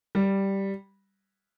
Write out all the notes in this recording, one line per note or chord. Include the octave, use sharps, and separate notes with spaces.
G3